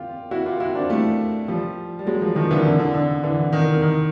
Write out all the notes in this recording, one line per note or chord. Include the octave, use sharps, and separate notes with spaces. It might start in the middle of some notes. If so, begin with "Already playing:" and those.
Already playing: F4 G4
E4 F#4
F4 G4
E4 F#4
C4 D4
G3 A3
F3 G3
G3
F#3 G#3
F3 G3
D#3 F3
D3 E3
D3
D3
D3
D3 E3
D#3
D#3